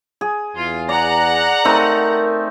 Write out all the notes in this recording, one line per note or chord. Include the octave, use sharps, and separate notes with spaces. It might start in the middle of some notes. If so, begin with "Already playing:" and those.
G#4
E2 F4
D5 F#5 A#5
A3 C4 D#4 A#4